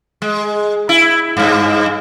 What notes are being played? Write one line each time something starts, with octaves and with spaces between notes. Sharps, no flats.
G#3
E4
G2 G#3